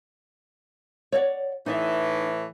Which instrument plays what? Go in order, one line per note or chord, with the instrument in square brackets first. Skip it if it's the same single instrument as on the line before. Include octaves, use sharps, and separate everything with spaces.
[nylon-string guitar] C#5 D5 F#5
[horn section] A2 E3 [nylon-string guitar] D#4 D5 E5